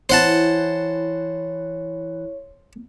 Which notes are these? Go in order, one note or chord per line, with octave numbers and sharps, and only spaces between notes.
E3 E4 C5 C#5 F#5 A5